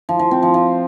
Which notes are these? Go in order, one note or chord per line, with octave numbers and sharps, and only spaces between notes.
F3
F3
C4
F3
F3